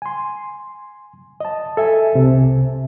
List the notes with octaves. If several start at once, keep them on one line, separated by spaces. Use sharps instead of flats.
G#5 C6
D#5 A5
A4 E5 G#5
C2 C3